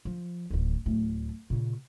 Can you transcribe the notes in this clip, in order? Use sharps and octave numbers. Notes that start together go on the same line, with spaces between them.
F3
D1 D#3
D1 A3
A#2 C#3